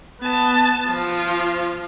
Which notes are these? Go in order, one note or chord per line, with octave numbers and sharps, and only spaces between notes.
B3 A5
F3 F4